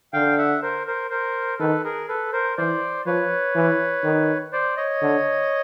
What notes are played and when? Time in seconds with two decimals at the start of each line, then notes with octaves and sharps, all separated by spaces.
0.13 D3 F5 G5
0.38 E5 F#5
0.62 A#4 C5
0.87 A#4 C5
1.10 A#4 C5
1.59 D#3 A4 B4
1.84 G#4 A#4
2.08 A4 B4
2.33 A#4 C5
2.58 E3 C5 D5
3.06 F3 B4 C#5
3.55 E3
4.03 D#3
4.52 C5 D5
4.77 C#5 D#5
5.02 D3